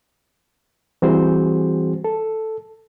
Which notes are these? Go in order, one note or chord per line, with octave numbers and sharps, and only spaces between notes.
E3 G3 C4 F#4 G#4 C5
A4